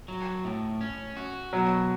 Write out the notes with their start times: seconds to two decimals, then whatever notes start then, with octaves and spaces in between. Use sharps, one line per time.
0.08 F#3
0.44 A2
0.81 C#4
1.17 F#4
1.53 B2 F#3